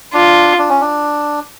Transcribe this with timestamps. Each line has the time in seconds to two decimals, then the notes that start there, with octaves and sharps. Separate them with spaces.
0.13 D4 F4
0.58 D4
0.70 C#4
0.81 D4